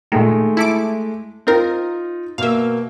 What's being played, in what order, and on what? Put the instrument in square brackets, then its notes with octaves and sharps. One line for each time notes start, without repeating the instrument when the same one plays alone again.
[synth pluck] A#2 D#3 [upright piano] G#3 A3
[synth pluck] E4 A4 D6
[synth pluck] C4 A#4 [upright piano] D#4 F4
[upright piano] B2 A#3 [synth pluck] E5 F5